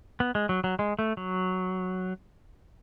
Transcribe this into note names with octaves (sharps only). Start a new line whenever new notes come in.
B3
G#3
F#3
F#3
G#3
A3
F#3